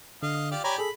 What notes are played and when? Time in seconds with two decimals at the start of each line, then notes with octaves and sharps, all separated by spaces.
0.23 D3 D#5 F5
0.51 F4 G4 D5
0.64 G4 C#5 D5 G#5 A#5 B5
0.78 G#4 A4 B5